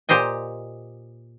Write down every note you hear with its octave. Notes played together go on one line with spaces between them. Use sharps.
A#2 G4 C5 D#5 G#5